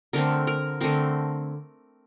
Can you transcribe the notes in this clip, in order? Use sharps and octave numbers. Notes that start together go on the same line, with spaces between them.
D3 A3 C4 A#4
A#4
D3 A3 C4 A#4